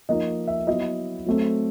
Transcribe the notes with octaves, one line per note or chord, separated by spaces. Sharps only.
F3 A#3 D#4 D#5
E5
F#3 B3 E4 D#5
F#3 A3 C4